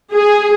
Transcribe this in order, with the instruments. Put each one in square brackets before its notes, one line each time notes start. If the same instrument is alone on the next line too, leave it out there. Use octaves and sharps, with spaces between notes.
[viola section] G#4